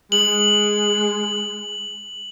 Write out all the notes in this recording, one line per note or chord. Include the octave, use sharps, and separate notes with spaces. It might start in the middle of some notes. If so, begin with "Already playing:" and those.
G#3 F#7